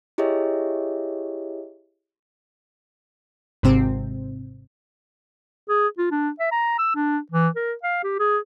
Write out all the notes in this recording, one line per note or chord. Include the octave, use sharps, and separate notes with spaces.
E4 G4 G#4 C#5 D#5 E5
G#1 G#2 C3 C4
G#4
F4
D4
E5
A#5
E6
D4
E3
A#4
F5
G4
G#4